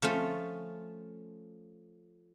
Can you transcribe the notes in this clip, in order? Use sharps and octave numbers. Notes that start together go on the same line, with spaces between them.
F3 A3 C#4 F4